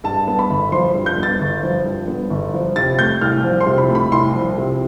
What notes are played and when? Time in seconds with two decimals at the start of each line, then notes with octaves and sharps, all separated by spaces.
0.04 G2 A5
0.28 B3
0.39 B5
0.50 G1
0.72 F3 C6
0.95 G2
1.06 G6
1.18 B3
1.23 A6
1.41 G1
1.63 F3
1.86 G2
2.08 B3
2.30 G1
2.54 F3
2.76 C3 A6
2.99 A3 G6
3.21 C2 F6
3.44 F3
3.61 C6
3.66 C3
3.78 B5
3.89 A3
3.95 B5
4.12 C2 C6
4.35 F3
4.58 C3